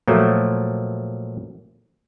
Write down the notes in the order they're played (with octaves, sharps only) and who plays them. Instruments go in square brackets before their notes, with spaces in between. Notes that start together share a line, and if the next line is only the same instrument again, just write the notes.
[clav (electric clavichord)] A#2 F3 F#3 A3